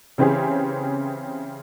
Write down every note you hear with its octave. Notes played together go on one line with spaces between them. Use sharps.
C#3 E3 C4 C#4 G4 G#4